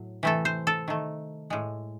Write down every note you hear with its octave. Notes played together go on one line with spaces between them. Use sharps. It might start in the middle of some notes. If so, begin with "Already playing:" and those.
Already playing: A2 F#3
C3 E3 A3 A4
C5
A4
D#3 A3
A2 G#3